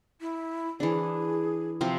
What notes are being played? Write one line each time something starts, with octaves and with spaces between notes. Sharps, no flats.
E4
E3 D4 G#4
C3 F3 C4